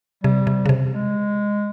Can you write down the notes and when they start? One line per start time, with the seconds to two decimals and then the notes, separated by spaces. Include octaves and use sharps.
0.24 C3 G3
0.47 C3
0.66 C#3
0.69 C3
0.92 G#3